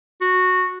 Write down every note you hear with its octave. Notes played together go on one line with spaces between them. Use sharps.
F#4